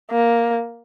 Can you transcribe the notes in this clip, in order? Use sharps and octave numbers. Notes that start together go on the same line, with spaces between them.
A#3